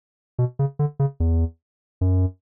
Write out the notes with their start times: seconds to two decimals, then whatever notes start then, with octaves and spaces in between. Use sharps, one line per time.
0.39 B2
0.59 C#3
0.79 D3
0.99 C#3
1.20 E2
2.01 F#2